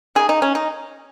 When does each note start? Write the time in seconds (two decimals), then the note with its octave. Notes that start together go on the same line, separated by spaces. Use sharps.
0.15 D#3 A#3 G#4
0.29 D#4
0.42 C#4
0.55 D#4